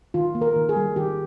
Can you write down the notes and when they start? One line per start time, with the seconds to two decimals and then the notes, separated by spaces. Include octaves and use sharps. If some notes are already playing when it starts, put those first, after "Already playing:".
0.14 D#3 F4
0.35 A#3
0.41 A#4
0.56 D#3
0.69 G#4
0.76 G3
0.96 D#3 G4